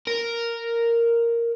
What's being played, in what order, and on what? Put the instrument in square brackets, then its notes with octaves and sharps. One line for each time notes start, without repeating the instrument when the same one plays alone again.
[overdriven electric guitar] A#4